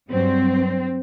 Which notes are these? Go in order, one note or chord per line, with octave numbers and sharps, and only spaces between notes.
G2 F#3 C4